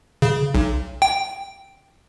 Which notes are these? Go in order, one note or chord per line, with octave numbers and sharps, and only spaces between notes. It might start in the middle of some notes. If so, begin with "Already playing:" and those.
C#3
B1
G5